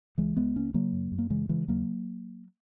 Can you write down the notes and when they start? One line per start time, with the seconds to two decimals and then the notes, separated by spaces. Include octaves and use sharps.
0.18 C#2 E3 G#3
0.37 C#2 G#3 B3
0.55 C#3 A#3 C#4
0.74 C#3 F#3 A#3
0.93 F#2
1.12 F#2
1.19 A#3
1.30 C#3 E3 G#3
1.49 C#3 E3 G#3
1.68 D#2 F#3 A#3